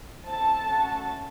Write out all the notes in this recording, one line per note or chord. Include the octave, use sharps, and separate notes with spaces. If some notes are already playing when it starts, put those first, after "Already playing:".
C4 E4 A4 A5
A3 C#4 F#4 A4